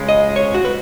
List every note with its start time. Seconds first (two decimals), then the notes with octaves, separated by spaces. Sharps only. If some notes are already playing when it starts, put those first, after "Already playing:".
Already playing: C#2 C#3 G#3
0.09 D#5
0.36 C#5
0.54 F#4
0.65 B4